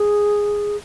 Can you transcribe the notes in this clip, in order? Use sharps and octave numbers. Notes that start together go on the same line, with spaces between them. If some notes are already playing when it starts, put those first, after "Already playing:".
Already playing: G#4